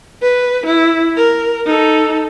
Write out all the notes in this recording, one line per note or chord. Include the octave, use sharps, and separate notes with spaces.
B4
E4
A#4
D#4 A4